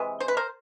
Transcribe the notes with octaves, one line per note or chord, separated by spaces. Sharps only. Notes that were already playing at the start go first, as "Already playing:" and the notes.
Already playing: C3 E3 G#3
C5
B4
A#4 C5